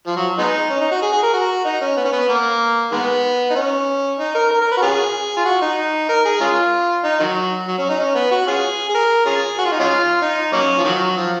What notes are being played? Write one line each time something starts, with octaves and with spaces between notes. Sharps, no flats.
F3
F#3
G#3 B3 D#4
C#4
D#4
F#4
G#4
G#4
A#4
F#4
D#4
C#4
B3
C#4
B3
A#3
D#3 G#3 B3
D#4
C#4
D#4
A#4
A#4
A#4
B4
F#4
C#4 F4 G#4
F4
F#4
D#4
A#4
G#4
G#3 C#4 F4
D#4
D#3 F#3
F#3
C#4
D#4
C#4
B3
F#4
C#4 F4 G#4
G#4
A#4
C#4 F4 G#4
F#4
F4
D#4
G#3 C#4 F4
D#4
F#3 A#3 C#4
F3
D#3 F#3
F3